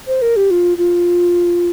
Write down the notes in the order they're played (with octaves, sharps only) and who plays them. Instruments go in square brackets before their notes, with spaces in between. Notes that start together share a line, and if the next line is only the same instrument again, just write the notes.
[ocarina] C5
A#4
G4
F4
F4